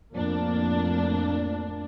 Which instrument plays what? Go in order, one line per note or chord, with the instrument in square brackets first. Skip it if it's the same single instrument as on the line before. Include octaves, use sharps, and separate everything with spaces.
[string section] F2 A2 A#3 D4